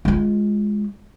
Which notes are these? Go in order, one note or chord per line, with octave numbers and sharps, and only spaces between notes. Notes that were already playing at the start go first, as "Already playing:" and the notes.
G#3 F4